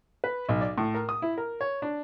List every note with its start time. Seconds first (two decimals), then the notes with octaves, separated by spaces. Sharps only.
0.24 B4
0.49 B1
0.61 D5
0.78 A2
0.95 A#4
1.09 D#6
1.22 E4
1.38 A#4
1.61 C#5
1.82 D4